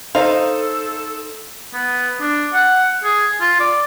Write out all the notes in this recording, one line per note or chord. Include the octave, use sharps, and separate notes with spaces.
D#4 A4 C5 F5
B3
D4
F#5
G#4
F4
D5